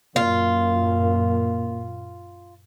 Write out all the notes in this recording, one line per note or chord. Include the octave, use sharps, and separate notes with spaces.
F#2 A#2 A#3 F4